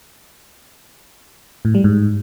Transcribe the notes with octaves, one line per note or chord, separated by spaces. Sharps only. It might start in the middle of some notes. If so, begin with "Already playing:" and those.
A2
G3
G#2